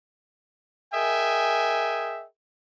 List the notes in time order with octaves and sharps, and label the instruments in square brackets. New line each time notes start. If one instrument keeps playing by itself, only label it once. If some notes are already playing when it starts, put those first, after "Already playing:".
[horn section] G#4 A#4 D#5 E5 G5 G#5